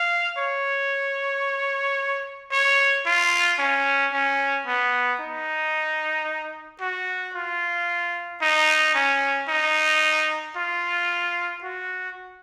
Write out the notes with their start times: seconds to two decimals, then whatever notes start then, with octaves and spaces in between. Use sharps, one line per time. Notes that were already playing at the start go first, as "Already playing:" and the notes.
Already playing: F5
0.37 C#5
2.51 C#5
3.05 F4
3.59 C#4
4.12 C#4
4.67 B3
5.20 D#4
6.81 F#4
7.35 F4
8.41 D#4
8.95 C#4
9.48 D#4
10.56 F4
11.63 F#4